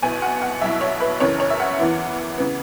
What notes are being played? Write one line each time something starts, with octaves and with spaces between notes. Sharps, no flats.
B1 B2 B3 E4 G#5
F#5
F#5
B1 B2 F#3 E4 E5
C#5
B4
F#1 F#2 C#3 E3 C#5
C#5
E5
F#5
E2 E3 B3 E4
C#3 E3 B3